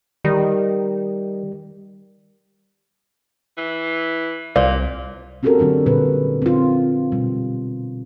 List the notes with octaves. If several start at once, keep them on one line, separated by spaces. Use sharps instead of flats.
D#3 G3
E3
C2 A#2 C5 D5 F5
C4 C#4 F#4 G4 A4 A#4
D3 F#3 D4 F#4
A#2 D3 G3 B4
C4 F4
B2 G3